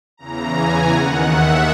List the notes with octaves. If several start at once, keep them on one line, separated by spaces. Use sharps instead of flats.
E2 C#3 E3 A#5
G#5
D#2 D#3 F#5
E5